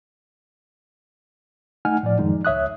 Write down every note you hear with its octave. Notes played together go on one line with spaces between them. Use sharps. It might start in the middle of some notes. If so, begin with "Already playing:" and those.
A3 D#4 F#5 G#5 F6
A2 F3 D5
F#2 D#3 F3 G#3 D#4
C#2 C#5 E5 D#6 F#6